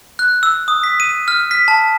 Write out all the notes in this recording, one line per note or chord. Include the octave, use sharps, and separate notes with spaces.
F#6
E6
D#6
B6
D#7
F6
B6
A5